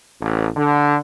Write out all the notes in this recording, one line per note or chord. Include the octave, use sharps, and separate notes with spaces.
A1
D3